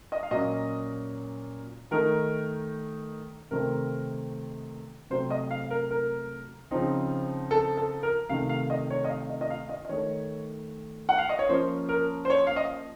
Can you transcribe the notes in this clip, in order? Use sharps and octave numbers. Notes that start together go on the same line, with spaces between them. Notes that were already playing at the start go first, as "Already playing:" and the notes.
D#5
F5
A#2 F#3 A#3 C#4 D#5
D#3 A3 D#4 A#4
C3 D#3 A3 C4 D#4 A#4
C3 F#3 A3 C4 C5
D#5
F5
A#4
A#4
C#3 F3 C4 D#4
A4
A4
A#4
C3 D#3 A3 D#4 F5
F5
D#5
C#5
D#5
F5
D#5
D#5
F5
D#5
D#5
D#3 A3 D#4 C#5
F#5
F5
D#5
C#5
F3 A#3 C#4 C5
A#4
C5
C#5
F5
D#5